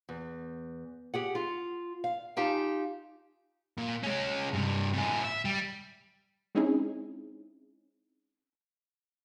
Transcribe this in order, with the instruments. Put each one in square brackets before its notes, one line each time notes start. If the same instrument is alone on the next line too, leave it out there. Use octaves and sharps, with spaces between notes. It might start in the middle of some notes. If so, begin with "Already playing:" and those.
[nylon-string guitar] E2
G4 G#4 F#5
F4
F5
D#4 F4 G4 F5 G#5 A5
[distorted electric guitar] A#2
G#3 C#4
G2 C3
A2 G#4
E5
G3
[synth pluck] G#3 C4 C#4 D#4 E4 G#4